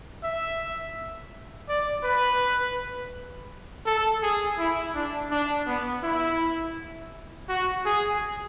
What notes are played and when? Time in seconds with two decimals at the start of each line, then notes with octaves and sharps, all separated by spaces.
0.23 E5
1.69 D5
2.04 B4
3.86 A4
4.23 G#4
4.59 E4
4.95 D4
5.31 D4
5.67 B3
6.03 E4
7.49 F#4
7.86 G#4